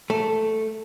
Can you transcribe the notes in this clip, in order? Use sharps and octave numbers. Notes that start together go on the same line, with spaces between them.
A3